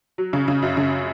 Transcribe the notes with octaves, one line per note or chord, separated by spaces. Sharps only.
F#3
C#3
C#3
F#2
C#3